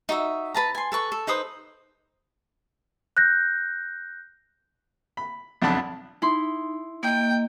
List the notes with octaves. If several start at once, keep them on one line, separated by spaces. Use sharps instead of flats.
D#4 F#4 E5
B4 A5 A#5
G#5 C6
A4 B4 C#6
A4
D#4 B4 C5 D#6
F#6 G6 A#6
B5
B1 F2 D4 A5 B5
D#4 E4 C6
A#3 D#5 G5